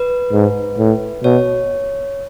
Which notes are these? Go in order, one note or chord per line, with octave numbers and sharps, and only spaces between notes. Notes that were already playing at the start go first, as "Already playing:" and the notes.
Already playing: B4
G#2
A2
B2 C#5